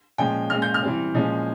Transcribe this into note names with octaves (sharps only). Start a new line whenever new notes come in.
A#2 F3 G#3 C#4 G5
A#2 G#3 C#4 F6
G6
F6
E3 G3 C4
A#2 F3 G#3 C#4